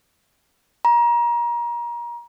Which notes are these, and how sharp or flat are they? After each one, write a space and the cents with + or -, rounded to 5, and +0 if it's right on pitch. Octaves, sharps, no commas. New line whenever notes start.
A#5 +30